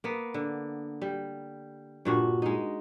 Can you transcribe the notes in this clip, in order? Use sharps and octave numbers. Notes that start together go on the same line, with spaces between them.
A#3 B3
D3
G3
G2 A#2 F#4
G#3 D#4